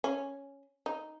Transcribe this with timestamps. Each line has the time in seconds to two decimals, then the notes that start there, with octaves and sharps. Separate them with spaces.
0.04 C#4
0.86 D#4